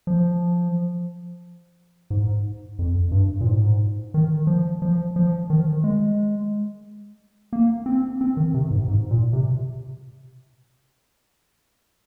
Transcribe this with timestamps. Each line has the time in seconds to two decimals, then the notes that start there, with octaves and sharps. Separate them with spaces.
0.07 F3
2.10 G#2
2.79 F2
3.11 G2
3.41 A#2
3.47 G#2
4.14 D#3
4.47 F3
4.82 F3
5.16 F3
5.50 D#3
5.84 G#3
7.53 A#3
7.86 C4
8.21 C4
8.37 D#3
8.54 C3
8.71 G#2
8.88 G#2
9.11 A#2
9.33 C3